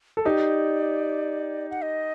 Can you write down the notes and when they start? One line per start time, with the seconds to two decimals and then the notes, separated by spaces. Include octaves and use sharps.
0.17 A4
0.25 D#4 G4 D5
1.71 F#5
1.82 D#5